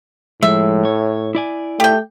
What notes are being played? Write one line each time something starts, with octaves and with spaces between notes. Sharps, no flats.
A2 F3 G#3 E5
C#5
E4 D5 G#5
A3 G4 G5